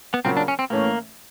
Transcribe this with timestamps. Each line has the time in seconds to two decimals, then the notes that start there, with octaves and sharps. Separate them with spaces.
0.14 B3
0.25 C#3 F#3 A#3 C4 C#4 F4
0.37 D4
0.48 C#4
0.59 C4
0.70 A2 E3 A3 A#3 C#4